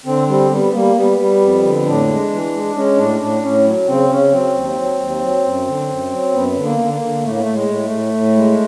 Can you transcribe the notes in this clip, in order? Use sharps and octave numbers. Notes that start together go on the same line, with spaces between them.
D3 C4
G3 C4
G3 B3
G3 A#3
G3 B3
G3
F2
D3
A2 D4
G#3
E3
G#3
G#3 C#4
A2 D4
A2 D4
A2 C#4
F#3
C#3 C4
C#3 C#4
F#3 C4
D#2
F#3
D#2
F#3
F#2
D3
F#2
F#3
F#2 B3
D3
A#3
D3
A#3
D3
A2 A3
A#3
A3
A2
G#3
A2
A3
A2
A2
G#3